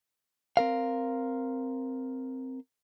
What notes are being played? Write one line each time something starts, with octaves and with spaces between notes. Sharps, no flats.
C4 A#4 F5